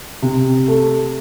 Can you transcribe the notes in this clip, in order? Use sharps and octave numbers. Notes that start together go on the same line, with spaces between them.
C3
A3